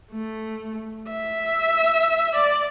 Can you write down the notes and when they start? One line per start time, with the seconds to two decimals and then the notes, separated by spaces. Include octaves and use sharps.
0.11 A3
1.10 E5
2.35 D5